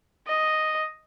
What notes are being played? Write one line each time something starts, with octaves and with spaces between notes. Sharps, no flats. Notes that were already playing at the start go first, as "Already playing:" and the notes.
D#5